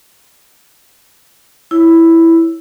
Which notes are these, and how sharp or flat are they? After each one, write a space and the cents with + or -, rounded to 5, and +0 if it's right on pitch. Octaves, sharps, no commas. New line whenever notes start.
E4 +0 C#5 -10